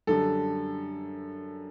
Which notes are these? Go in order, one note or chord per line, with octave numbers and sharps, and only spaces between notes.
F#2 D3 G3 A4